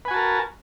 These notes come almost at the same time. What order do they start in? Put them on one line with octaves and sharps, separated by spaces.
B4 G#5 F#4 A5 A#4